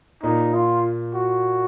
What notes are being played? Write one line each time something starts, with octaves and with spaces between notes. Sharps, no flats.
A#2 D#4
F4
F#4